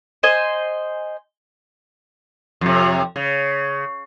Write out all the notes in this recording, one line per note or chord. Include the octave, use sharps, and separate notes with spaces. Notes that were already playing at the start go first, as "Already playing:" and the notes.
C5 D#5 G#5
F2 C3
C#3